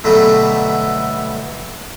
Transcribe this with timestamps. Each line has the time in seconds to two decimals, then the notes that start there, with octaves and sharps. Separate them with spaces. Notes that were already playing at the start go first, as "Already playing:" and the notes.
0.04 B2 D3 F#3 G3 A3